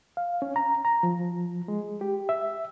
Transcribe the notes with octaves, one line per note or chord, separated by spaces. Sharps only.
F5
C#4
A#5
A#5
F3
G#3
G4
E5